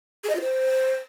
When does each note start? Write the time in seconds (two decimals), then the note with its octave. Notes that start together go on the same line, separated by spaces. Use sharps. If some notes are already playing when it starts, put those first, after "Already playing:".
0.24 G#4
0.29 D#5
0.35 F4
0.41 C5